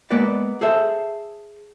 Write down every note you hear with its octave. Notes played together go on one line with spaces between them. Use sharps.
G#3 A#3 B3 B4 D5
G#4 A4 C5 E5